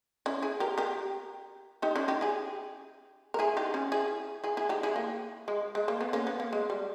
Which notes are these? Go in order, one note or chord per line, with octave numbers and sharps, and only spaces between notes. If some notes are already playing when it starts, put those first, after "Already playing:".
C#4 E4
E4 G#4
G4 A#4
G4 A#4
D#4 G4
C#4 E4
D#4 G4
E4 G#4
A#4
E4 G#4
D#4 G4
C#4 E4
E4 G#4
E4 G#4
E4 G#4
D#4 G4
E4 G#4
A#3
G#3
G#3
A#3
B3
A#3 C#4
B3
A#3
G#3
G3